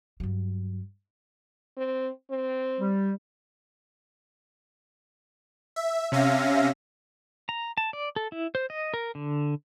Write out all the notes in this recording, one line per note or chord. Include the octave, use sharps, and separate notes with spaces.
G2 F#3
C4
C4
G3
E5
C3 C#4 E5 F5 A#6
A#5
A5
D5
A4
E4
C5
D#5
A#4
D3